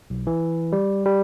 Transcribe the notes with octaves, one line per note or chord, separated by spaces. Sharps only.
B1
E3
G3
G3